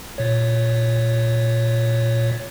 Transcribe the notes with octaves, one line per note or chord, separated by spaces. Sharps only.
A#2 C#5